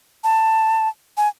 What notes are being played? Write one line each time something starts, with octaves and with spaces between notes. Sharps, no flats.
A5
G#5